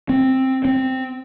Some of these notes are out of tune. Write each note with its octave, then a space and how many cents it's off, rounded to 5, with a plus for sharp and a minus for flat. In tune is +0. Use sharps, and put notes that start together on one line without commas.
C4 +5
C4 +0